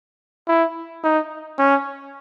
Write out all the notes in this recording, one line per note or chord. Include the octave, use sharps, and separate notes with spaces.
E4
D#4
C#4